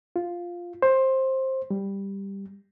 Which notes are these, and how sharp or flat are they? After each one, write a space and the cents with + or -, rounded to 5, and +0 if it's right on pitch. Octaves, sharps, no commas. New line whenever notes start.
F4 +0
C5 +15
G3 +5